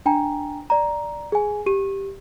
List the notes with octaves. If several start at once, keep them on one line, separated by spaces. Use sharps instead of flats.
D4 G5 G#5 A#5
D5 A#5
G#4 G#5
G4 D#7